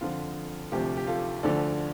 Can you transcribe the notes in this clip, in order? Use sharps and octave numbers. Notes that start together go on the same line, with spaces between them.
F2 D3 F3 F4
D2 C3 F3 G4
G4
F4 A4
D2 D3 F3 A4 D5